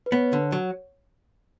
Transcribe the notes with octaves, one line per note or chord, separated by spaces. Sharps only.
B4
B3 C#5
D3
F#3